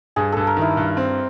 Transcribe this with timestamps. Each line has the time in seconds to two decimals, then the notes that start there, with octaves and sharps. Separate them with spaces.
0.16 G2 G#4
0.32 G2 A4
0.47 A#4
0.57 D#3 E4
0.77 G2
0.97 C4